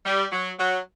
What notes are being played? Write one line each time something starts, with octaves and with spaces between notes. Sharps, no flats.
G3
F#3
F#3